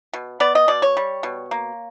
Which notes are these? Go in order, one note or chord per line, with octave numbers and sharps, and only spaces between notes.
B2
B3 D5
D#5
B2 D5
C#5
G3
B2
A#3